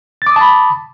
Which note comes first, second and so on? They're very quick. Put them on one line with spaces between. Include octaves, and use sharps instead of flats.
A6 D6 D#6 A5 B5